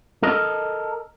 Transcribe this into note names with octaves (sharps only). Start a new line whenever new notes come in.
A4 A#4 D#5